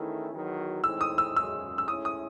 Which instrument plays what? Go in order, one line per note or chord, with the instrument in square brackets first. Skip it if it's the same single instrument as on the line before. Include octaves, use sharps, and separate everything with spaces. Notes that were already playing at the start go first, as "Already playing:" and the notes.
Already playing: [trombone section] E2 D#3 A3 C#4 E4
E2 D#3 F#3
[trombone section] A2 E3 G#3 C4 D#4 [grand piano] E6
[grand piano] D#6
E6
[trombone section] G#1 F#2 C#3 G#3 [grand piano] E6
[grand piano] E6
[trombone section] A2 G#3 C#4 E4 [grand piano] D#6
[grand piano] D#6